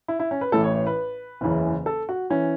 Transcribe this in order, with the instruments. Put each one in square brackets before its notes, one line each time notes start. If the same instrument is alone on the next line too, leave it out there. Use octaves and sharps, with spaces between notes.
[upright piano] E4
E4
C#4
B4
A1 A2 E3 A4
C#5
C#5
B4
F#1 E2 C#3 E3
A4
F#4
E3 C#4